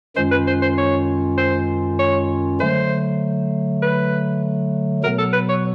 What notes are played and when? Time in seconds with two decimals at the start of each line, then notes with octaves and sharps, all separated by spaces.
0.16 F#2 D#3 G#3 C#4 F4 C5
0.31 B4
0.47 C5
0.62 C5
0.78 C#5
1.38 C5
1.99 C#5
2.60 D3 F#3 A3 C5
3.82 B4
5.03 B2 F#3 B3 A#4
5.18 A4
5.33 B4
5.49 C#5